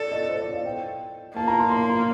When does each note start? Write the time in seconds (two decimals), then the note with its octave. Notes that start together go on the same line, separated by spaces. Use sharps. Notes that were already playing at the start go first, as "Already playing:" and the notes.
Already playing: A4 D5
0.12 D#5
0.29 C5
0.41 D5
0.53 F5
0.65 G5
1.35 A#3 A5
1.48 A#5
1.59 C6
1.71 C6
1.90 C6